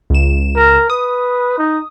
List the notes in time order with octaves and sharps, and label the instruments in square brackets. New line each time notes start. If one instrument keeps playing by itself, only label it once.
[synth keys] C#2 E7
[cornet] A#4
[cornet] B4 [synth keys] D#6
[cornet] D#4